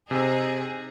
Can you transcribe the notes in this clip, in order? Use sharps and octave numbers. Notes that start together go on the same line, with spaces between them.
C3 D#4 G#4 C5 E6